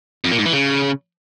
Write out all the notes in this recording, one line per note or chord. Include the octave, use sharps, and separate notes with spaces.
F2
A#2
G#2
E3
C#3